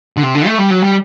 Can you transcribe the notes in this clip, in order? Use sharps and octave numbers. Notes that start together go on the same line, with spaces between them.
D3
C3
D3
A3
G3
F#3
G3